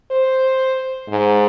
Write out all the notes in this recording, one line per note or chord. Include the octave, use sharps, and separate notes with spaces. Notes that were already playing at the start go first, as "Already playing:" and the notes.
C5
G#2